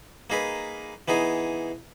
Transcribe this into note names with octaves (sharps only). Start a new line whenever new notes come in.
A#3 D#4 G#4 B4
E3 B3 D#4 G#4